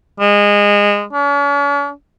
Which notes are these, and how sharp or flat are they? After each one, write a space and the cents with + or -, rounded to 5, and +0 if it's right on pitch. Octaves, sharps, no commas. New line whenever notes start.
G#3 -20
C#4 +45